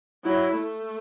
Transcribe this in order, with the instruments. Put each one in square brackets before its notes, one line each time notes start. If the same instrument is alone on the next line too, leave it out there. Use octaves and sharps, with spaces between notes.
[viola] F#3 [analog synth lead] E4
[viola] A3